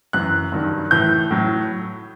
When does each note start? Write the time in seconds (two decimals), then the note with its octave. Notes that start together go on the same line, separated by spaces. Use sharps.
0.13 F#2 E3 F#6
0.52 G2 D#3 F#3
0.91 A2 E3 G6
1.31 A2 F#3